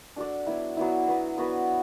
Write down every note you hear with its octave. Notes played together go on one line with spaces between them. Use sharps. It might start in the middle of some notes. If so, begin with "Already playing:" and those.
D4 F#4 A4 D5
F#3 B3 E4
F#3 B3 E4
B3 F#4 B4
B3 F#4 B4